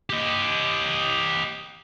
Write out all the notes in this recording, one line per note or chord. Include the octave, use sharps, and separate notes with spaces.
G4 D#5